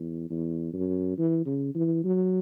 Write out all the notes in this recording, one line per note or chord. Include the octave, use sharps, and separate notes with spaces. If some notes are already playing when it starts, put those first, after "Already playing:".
Already playing: E2
E2
F#2
E3
C#3
E3
F#3